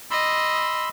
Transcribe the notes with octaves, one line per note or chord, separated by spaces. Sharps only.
D#5 B5 C6 E6